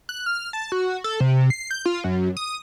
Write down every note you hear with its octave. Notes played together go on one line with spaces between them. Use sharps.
F#6
F6
A5
F#4
A4
C3
C7
G6
F4
F#2
D#6